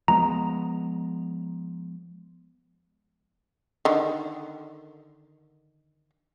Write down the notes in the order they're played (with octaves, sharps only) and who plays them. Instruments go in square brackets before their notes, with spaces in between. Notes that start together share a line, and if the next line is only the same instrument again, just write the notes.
[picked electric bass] F3 G#3 B3 [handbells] A#5
[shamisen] D3 D#3